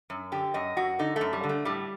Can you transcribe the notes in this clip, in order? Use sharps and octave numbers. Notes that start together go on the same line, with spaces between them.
F#2
D3 G4
F#2 D#5
F#2 F#4
D3 D#4
A3
F#2
G3
D3
A3
A2 G3